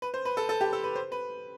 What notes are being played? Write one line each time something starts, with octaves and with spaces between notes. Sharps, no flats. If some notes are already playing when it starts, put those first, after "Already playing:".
B4
C5
B4
A4
A4
G4
A4
B4
C5
B4